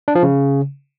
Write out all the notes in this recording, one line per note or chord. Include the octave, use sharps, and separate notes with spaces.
D4
F3
C#3